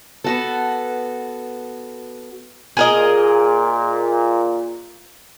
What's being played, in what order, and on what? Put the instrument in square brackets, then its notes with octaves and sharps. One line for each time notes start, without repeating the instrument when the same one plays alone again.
[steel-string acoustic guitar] B3 F#4 A4
[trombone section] A#2 [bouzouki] G#4 A#4 D#5